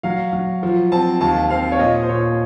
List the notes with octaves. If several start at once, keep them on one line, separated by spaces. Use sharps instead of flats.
F#3 F5
F#3
F3
C4 A5
D#2 A5
C4 F5
C#5
A#2 D#5
C5
A#2 C#5